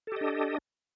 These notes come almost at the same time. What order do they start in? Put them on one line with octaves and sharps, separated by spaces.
A4 G4 D#5 D4